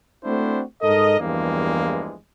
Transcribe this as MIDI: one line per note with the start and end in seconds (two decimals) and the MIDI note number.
0.24 0.61 57
0.24 0.61 60
0.24 0.61 62
0.24 0.61 64
0.24 0.61 66
0.24 0.61 72
0.82 1.18 44
0.82 1.18 69
0.82 1.18 70
0.82 1.18 75
1.19 2.17 40
1.19 2.17 43
1.19 2.17 52
1.19 2.17 53
1.19 2.17 56
1.19 2.17 58